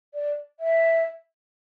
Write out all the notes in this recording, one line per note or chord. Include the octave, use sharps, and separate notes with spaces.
D5
E5